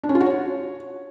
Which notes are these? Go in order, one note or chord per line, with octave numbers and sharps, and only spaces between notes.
D4
C#4
F4
F#4
C#5